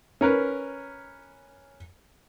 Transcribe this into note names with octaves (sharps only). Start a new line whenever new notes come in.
C#4 A#4 B4